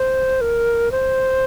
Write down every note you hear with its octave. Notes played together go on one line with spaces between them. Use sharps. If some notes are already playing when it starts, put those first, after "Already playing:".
Already playing: C5
A#4
C5